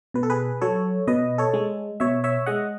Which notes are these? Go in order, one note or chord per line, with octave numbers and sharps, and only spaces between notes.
B2 B4
A4
G#4 B4
F#3 A4 C#5
B2 B4 D#5
A4 C#5
G#3
B2 C#5 E5
C#5 E5
G#3 D#5 F#5